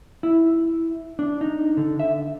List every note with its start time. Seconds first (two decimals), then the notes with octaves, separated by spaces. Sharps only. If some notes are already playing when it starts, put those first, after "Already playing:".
0.23 E4
1.19 D4
1.41 D#4
1.77 D3
2.00 E5